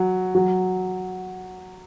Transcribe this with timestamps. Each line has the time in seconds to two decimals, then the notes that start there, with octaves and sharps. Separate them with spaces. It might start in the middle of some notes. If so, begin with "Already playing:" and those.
Already playing: F#3
0.35 F#3